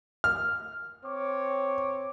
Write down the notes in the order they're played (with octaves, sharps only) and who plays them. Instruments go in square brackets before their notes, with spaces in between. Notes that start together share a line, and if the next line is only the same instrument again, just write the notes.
[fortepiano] F6
[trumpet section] C4 C#5 D6